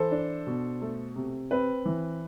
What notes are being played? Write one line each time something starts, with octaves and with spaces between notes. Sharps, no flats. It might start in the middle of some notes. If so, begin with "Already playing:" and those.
Already playing: E3 A4 C5
D4
B2
A3
C3
C4 B4
E3